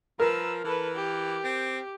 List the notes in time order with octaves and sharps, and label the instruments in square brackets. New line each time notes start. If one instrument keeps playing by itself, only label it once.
[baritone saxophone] F3 [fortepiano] A#4 [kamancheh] B4 E6
[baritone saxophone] E3 [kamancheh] A4 B4
[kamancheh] G4
[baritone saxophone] C4